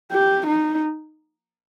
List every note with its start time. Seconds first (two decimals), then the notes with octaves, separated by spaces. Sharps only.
0.11 G4
0.47 D#4